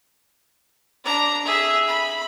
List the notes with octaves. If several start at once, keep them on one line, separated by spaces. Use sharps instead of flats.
D4 A#5
G#4 E5
B5